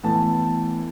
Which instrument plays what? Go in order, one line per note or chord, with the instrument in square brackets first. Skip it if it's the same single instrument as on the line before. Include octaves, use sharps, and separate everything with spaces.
[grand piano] A2 E3 B3 A5